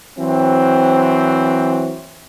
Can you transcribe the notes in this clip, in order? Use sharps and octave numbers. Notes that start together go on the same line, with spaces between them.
E3 F#3 C4